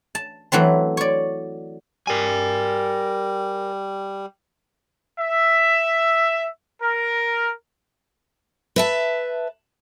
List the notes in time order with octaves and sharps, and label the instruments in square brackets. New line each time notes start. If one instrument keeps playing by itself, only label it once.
[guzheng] A5
E3 F#3 A3 C4
C#5 D5
[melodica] G3 [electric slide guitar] A#4 G#5
[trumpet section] E5
A#4
[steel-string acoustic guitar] B4 E5 A5